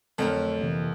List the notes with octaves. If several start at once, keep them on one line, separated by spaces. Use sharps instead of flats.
F2 D3 F#3 A3 A#4
C3 E3 A#3